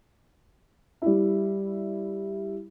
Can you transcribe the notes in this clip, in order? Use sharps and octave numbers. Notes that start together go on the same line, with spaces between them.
G3 E4